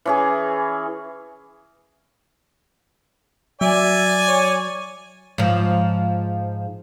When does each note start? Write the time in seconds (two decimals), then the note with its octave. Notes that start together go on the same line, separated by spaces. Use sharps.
0.05 E3 C#4 G#4
3.61 F#3 D5 E5 G#5
4.28 C#5
5.38 G#2 F3